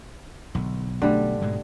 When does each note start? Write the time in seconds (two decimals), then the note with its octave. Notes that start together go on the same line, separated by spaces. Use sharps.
0.55 B1 D3
1.02 D3 G3 A3
1.42 G#2 B2 G#3